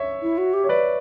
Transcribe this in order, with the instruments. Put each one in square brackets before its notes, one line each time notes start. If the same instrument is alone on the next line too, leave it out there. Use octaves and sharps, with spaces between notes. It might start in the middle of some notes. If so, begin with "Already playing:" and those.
Already playing: [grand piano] C#5 E5
[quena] E4
F#4
G4
[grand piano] C#5
B4 D5